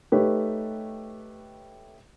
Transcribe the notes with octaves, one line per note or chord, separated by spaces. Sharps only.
A3 D#4 G4 B4 C#5